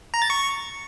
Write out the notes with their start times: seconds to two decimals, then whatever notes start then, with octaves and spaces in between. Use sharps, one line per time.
0.14 A#5
0.22 A6
0.30 C#6